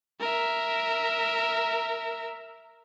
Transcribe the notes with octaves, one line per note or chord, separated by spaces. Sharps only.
A#4 E5